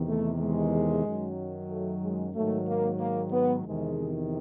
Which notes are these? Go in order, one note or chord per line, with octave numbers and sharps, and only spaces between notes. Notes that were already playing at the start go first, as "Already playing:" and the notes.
Already playing: E2 C3 D#3
A3
G#3
F#2 D#3 F#3
A3
G#3
G#2 D#3 F#3 A3
A#3
A#3
B3
E2 C3 D#3 G#3